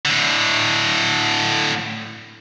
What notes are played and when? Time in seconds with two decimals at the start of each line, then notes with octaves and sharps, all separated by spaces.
0.05 A2 D3